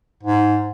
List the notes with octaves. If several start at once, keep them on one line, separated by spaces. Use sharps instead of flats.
G#2